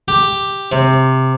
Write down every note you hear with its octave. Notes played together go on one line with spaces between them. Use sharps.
G4
C3